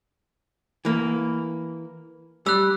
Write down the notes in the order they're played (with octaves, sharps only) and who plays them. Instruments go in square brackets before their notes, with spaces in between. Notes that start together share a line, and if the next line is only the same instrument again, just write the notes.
[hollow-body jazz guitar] E3 A#3
[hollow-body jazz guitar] G3 [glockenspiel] E6 F#6